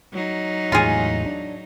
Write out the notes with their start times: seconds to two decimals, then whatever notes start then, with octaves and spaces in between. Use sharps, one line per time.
0.12 F#3 D#4
0.72 E2 A2 G#3 F4 G#4
1.26 D4